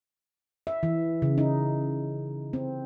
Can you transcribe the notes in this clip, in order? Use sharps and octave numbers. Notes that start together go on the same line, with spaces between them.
E5
E3
C#3
D#4
C4